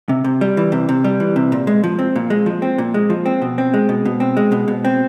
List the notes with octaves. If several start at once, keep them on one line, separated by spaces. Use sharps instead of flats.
C3
C3
G3
E3
C3
C3
G3
E3
C3
A#2
G#3
F3
C4
A#2
G#3
F3
C4
A#2
G#3
F3
C4
B2
C4
G#3
B2
B2
C4
G#3
B2
B2
C4